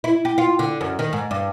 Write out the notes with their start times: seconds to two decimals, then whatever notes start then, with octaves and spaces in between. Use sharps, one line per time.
0.04 E4
0.25 G4
0.38 F4
0.59 D3
0.81 F#2
0.99 D#3
1.13 G#2
1.31 G2